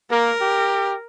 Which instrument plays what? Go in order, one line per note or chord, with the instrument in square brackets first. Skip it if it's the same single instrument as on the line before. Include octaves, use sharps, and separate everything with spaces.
[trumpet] A#3 [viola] A#4
[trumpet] G4